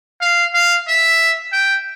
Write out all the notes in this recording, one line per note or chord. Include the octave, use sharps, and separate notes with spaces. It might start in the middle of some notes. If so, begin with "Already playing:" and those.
F5
F5
E5
G5